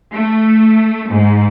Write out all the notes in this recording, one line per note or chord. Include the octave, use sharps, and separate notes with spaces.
A3
G#2